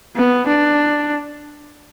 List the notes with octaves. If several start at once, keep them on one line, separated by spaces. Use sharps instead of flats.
B3
D4